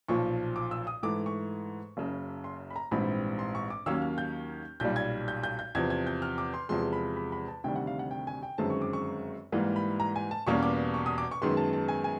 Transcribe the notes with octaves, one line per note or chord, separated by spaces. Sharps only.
B1 A#2 F3 C#6
D6
E6
D#6
G#2 E3 A3 D6
C#6
F#1 F#2 C#3
C6
B5
A#5
A#1 G#2 E3 G3 C4 B5
C6
C#6
D6
D#2 D#3 F#3 A#3 C#4 E6
F6
G6
B1 A#2 G3 G6
G#6
G6
G6
G6
E2 C3 F3 G#6
G#6
G6
F6
D6
C6
E2 C3 F3 G#3 C6
B5
B5
B5
A5
D2 C3 D#3 G3 G5
F#5
F5
F#5
G5
G#5
G5
G1 F#2 D#3 G#3 C4 A5
C#6
D6
C#6
G#2 E3 G3 A#3
B5
A#5
G#5
A5
E2 B2 G3 A#3 C#4 C#6
D6
C#6
D#6
D6
C#6
F#2 D#3 G#3 B3 C6
A5
A5
G#5
G#5